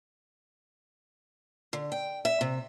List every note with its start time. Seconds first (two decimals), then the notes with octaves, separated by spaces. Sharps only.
1.73 D3
1.92 G5
2.25 E5
2.41 C3